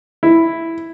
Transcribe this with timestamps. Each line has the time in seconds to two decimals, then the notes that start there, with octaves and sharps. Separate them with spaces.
0.23 E4